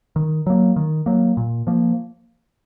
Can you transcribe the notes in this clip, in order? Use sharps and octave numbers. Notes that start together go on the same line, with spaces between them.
D#3
F#3 A#3
D#3
F#3 A#3
A#2
F3 A#3